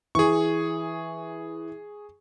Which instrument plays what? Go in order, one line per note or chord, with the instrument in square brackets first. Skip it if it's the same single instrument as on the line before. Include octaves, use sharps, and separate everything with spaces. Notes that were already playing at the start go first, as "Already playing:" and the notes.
[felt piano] E3 [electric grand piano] G#4 C#6